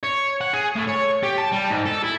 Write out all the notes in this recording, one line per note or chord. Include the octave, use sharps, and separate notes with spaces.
C#5
F#5
G#4
A2
C#5
G4
A5
G3
G#2
A4
E4